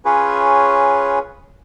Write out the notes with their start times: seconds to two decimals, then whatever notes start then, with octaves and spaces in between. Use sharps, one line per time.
0.05 C#4 F4 G#4 B4 C#5